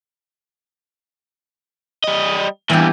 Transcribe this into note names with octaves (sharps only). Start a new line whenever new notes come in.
G3 D#5
E2 G2 E3 G4